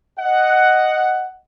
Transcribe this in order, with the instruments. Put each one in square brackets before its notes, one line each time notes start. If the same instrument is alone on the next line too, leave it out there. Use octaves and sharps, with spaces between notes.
[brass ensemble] D#5 F#5